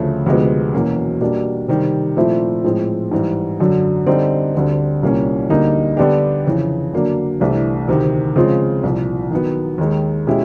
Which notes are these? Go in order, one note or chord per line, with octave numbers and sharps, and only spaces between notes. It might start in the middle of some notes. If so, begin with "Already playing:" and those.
Already playing: D2 C#3 F3 A3
D2 C3 F3 G#3 B3
E2 B2 F#3 A#3 C#4
B2 G3 A#3 D4
C3 D#3 G3
A#2 F3 A3 C4 E4
A2 F3 G#3 C4
G#2 E3 G3
F#2 D3 F#3
D3 G3 C4 D#4
D2 D3 G3 C4
C2 A#2 G3 A#3 C#4
D2 D3 G3 A#3 D#4
D3 G3 B3 D4 G4
F2 C#3 E3
D3 F#3 A#3 D4
C2 C3 E3 A3 D4
D2 C3 D#3
C#3 F3 G#3 C4 F4
C2 A#2 F3
D#3 F#3 B3
D#2 D#3 G#3
B2 G#3 C#4 E4 G4